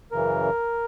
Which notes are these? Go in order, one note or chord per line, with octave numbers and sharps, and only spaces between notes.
F#2 C#3 E3 A#4